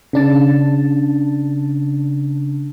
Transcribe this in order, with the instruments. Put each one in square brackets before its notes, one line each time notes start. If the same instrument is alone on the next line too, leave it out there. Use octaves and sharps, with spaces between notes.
[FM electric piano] C#3 D4 A5